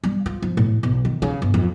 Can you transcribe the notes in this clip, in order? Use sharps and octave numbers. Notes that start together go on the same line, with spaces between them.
G3
F4
F3
A2
B1
D#3
C#3
G1
F2